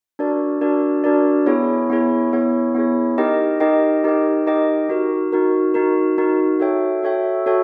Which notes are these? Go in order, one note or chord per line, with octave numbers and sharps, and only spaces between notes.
D4 F#4 A#4 D5
D4 F#4 A#4 D5
D4 F#4 A#4 D5
B3 E4 G#4 C#5
B3 E4 G#4 C#5
B3 E4 G#4 C#5
B3 E4 G#4 C#5
D#4 G4 A#4 D#5 G5
D#4 G4 A#4 D#5 G5
D#4 G4 A#4 D#5 G5
D#4 G4 A#4 D#5 G5
D#4 F#4 A#4
D#4 F#4 A#4
D#4 F#4 A#4
D#4 F#4 A#4
F#4 A4 C#5 E5 G5
F#4 A4 C#5 E5 G5
F#4 A4 C#5 E5 G5